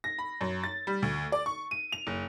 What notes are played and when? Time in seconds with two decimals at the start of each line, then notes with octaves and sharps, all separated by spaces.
0.04 A#6
0.19 B5
0.41 F#2
0.64 A6
0.87 G3
1.02 D2
1.32 D5
1.46 C#6
1.71 D#7
1.92 F7
2.07 F#1